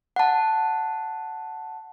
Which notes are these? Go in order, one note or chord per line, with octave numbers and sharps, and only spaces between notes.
F#5 A5